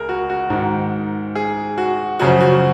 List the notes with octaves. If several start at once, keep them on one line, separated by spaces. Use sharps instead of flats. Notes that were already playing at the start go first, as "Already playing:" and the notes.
Already playing: C#2 G#4 A#4
F#4
F#4
G#2 D#3
G#4
F#4
F#2 C#3 F3 F#4
F#4